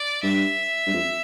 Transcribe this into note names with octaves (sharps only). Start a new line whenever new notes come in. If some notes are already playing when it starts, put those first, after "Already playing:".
Already playing: D5
G2 E5
G2
F2